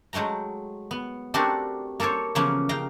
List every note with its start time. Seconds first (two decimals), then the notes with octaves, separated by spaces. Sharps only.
0.13 F#3 G#3 A3 G5 A#5
0.91 B3
1.34 A3 C4 D4 F#4 G4 A#4
2.00 A#3 A4 A#4 C5 C#5
2.35 C#3 E3 F3 A#3 B3 C#4
2.69 C#3 F5 G5 A#5